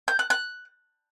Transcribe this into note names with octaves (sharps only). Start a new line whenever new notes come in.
G6
F#6
F#6